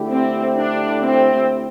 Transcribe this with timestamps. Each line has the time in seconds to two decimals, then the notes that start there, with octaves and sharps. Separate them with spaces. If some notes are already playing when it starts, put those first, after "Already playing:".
Already playing: D3 A3 E4 G4
0.10 C4
0.56 D4
1.03 C4